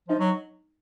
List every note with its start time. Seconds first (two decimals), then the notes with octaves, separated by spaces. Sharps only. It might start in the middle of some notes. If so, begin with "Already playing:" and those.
0.08 F3 D#4
0.19 F#3